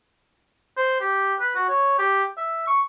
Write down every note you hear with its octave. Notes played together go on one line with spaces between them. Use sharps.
C5
G4
B4
F#4
C#5
G4
E5
C#6